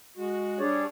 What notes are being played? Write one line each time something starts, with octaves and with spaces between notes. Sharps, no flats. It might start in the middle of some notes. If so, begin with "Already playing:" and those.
G#3 F#4
G3 D4 G#4 C#5 D5